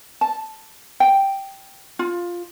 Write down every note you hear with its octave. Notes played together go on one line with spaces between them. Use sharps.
A5
G5
F4